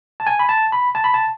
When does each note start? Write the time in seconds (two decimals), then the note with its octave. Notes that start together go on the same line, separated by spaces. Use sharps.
0.20 A5
0.27 G#5
0.39 B5
0.49 A5
0.72 B5
0.95 A5
1.04 B5
1.14 A5